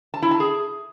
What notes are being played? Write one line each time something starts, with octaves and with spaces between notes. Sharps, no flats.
A5
E4
A5
G#4